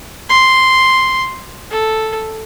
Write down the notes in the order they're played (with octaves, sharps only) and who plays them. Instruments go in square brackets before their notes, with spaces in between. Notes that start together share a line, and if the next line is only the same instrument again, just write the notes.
[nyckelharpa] C6
A4